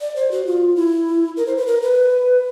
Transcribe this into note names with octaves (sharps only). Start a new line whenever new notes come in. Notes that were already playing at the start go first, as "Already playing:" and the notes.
D5
C5
F#4
F4
E4
A#4
C5
B4
A#4
B4